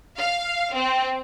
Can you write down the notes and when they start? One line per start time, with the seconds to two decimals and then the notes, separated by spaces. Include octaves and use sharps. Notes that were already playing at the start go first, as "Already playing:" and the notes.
0.17 F5
0.73 C4